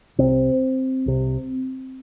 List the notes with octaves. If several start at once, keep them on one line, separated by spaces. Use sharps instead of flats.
C2 C3 C4
C2 C3